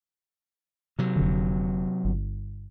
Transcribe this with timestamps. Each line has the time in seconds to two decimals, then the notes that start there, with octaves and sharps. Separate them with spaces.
0.99 C3 F#3
1.16 F1 D3
2.05 G1